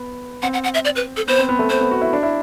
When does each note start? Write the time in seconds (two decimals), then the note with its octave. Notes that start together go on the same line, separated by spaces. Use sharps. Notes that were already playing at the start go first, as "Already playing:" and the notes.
Already playing: B3
0.42 C4 F#5
0.53 F#5
0.64 F#5
0.74 E5
0.85 D5
0.96 B4
1.17 A4
1.28 B3 C5
1.39 C4
1.49 B3
1.59 A3
1.70 B3 C5
1.81 B3
1.91 F#4
2.01 E4
2.13 D4
2.23 E4